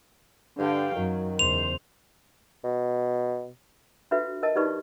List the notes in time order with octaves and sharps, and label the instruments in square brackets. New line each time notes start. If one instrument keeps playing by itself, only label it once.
[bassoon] G2 [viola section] D3 F5 G5
[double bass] F#2 [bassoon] D#3 [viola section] F#3
[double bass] E2 C#3 [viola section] C5 [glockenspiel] F7
[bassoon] B2
[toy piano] D4 F4 F#4 A4 B4 E5
A#4 D#5 A5
D#4 F4 G4 B4 D5 C#6